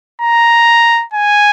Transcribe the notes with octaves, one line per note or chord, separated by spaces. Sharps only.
A#5
G#5